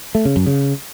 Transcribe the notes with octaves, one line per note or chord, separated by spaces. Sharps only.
A3
C#3
F#2
C#3